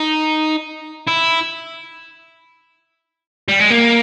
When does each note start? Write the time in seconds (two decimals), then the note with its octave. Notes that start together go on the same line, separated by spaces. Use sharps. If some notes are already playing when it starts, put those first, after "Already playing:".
Already playing: D#4
1.08 E4
3.49 G3
3.60 G#3
3.70 A#3